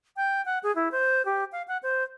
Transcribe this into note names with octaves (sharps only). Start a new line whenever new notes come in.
G5
F#5
G#4
E4
C5
G4
F5
F#5
C5